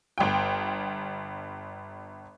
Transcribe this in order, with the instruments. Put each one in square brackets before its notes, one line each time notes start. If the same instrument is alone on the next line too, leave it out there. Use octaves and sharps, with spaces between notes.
[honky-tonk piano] G1 G5